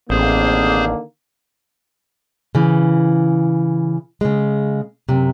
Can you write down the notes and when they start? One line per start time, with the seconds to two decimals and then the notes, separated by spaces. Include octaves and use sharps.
0.10 A1 D3 D#3 A#3 C4 G#4 C5
2.55 C#3 E3
4.21 C#3 G#3
5.09 F#2 C3